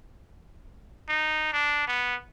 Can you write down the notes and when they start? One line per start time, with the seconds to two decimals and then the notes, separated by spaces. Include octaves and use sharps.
1.09 D#4
1.53 D4
1.87 B3